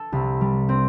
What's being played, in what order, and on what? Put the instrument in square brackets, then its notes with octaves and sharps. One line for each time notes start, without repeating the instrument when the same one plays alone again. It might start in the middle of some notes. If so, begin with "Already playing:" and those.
Already playing: [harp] A4
C2
G3
C4